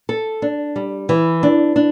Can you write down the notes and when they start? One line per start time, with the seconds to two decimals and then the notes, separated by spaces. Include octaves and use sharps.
0.09 A4
0.42 D4
0.76 G3
1.09 E3
1.43 D4
1.76 D4